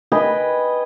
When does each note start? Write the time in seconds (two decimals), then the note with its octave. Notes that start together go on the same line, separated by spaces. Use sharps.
0.12 B4 D#5 G5 G#5